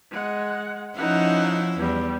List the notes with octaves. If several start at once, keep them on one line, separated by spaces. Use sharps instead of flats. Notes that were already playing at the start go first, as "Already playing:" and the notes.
G#3 F#5
F3 C#4 D#4 E4 F#5
E2 G3